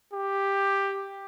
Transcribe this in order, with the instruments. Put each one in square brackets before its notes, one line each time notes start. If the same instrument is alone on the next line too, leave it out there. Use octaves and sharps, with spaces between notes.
[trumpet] G4